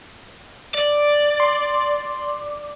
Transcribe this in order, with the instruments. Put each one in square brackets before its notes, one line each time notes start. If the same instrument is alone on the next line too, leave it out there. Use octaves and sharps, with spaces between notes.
[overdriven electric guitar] D5
[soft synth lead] C6